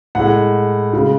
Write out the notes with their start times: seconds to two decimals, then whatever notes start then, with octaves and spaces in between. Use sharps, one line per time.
0.15 A2 G#3 F#5
0.93 C#3 G#3